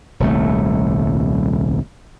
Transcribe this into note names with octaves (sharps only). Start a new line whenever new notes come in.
D#1 C2 A3